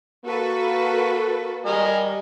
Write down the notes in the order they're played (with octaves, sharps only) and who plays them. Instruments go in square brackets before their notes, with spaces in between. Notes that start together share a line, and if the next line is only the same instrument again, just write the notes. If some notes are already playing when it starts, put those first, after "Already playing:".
[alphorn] A#3 [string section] F#4 A4 B4
[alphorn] G3 [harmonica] A#4 D#5 G#5